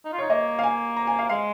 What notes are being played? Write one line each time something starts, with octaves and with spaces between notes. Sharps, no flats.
D#4
F4
D#4 C#5
A#3 D#5
F5
G#5
A#5
G#5
F5
G#3 F5